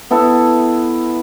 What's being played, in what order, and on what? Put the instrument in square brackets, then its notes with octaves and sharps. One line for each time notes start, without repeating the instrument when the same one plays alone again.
[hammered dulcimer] B3 E4 A4